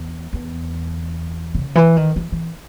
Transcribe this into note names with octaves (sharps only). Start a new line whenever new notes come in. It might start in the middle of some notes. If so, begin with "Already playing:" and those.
Already playing: E2
E2
C#3
E3
D#3
E3
E3